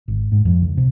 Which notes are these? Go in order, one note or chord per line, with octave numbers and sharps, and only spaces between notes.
G#1
G#2
F2
C#2
C3